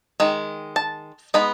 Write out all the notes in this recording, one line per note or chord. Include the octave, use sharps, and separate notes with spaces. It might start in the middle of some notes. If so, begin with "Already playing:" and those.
D#3 G#3
A5
G#3 B3 D#4 B5